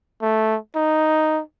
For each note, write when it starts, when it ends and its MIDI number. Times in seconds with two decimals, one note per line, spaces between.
0.22 0.57 57
0.75 1.41 63